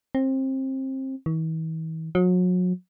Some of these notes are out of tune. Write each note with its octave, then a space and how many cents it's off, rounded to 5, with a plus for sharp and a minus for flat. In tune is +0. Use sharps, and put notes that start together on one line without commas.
C4 +25
E3 -45
F#3 -35